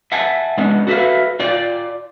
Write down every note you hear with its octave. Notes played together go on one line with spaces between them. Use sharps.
E5 F#5 G#5 A5
G#3 B3 C#4 D4
F#4 A4 B4 C5 E5 F5
F4 D5 G5